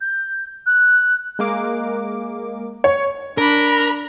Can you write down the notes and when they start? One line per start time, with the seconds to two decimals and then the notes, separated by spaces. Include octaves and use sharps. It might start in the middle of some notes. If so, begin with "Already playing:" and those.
0.01 G6
0.66 F#6
1.39 G#3 A#3 D6
2.84 C#5
3.38 D4 A#4 B5